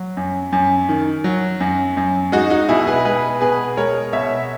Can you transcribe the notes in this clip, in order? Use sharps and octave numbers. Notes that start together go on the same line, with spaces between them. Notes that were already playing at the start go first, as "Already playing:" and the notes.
Already playing: F#3
F#2
F#2
D#3
F#3
F#2
F#2
G#3 D#4 F#4
D#4 F#4
B2 E4 G#4
G#4 B4
G#3 G#4 B4
B2 G#4 B4
G#3 A#4 C#5
B2 C#5 E5